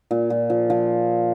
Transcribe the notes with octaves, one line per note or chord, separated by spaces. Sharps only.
A#2
A#2
F3
F3